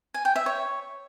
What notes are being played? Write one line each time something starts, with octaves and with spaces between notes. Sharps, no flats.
G#5
G5
E5
C#5